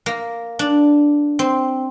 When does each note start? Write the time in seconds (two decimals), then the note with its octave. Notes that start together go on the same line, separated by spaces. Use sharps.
0.06 A#3
0.59 D4
1.39 C4